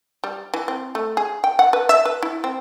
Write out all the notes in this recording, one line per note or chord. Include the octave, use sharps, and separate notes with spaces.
G3
E3
C4
A3
G#4
G5
F#5
B4
E5
B4
E4
C4